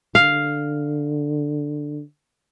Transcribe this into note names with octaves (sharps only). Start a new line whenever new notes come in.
D3 F5